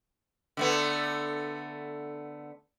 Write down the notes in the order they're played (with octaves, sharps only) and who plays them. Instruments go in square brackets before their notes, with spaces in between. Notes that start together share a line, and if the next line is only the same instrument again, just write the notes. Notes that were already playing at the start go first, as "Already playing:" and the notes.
[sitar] D3 A3 B3